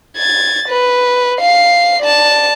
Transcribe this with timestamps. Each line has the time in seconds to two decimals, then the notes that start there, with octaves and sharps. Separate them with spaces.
0.17 G#6 A6
0.68 B4
1.40 F5 C7
2.02 D5 A5